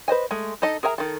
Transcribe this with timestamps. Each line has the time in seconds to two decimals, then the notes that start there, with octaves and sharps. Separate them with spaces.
0.08 B4 C5 D#5 G#5
0.31 G#3 A3
0.62 D#4 A4 D#5
0.83 G#4 A#4 E5 G#5 A#5
0.98 D#3 A4